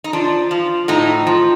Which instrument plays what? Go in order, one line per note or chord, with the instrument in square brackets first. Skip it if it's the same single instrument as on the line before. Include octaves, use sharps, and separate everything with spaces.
[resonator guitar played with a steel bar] D#4
F3 D4
F3
A2 D#4
F3